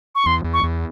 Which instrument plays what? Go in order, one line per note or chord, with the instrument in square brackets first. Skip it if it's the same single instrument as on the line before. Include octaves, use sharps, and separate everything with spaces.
[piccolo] C#6
[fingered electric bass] E2 [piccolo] C6
[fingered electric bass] E2
[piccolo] C#6
[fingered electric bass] E2